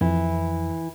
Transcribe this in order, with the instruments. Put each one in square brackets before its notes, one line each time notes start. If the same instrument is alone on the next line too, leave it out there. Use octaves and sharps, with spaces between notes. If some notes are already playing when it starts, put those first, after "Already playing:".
[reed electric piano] F2 [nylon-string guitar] E3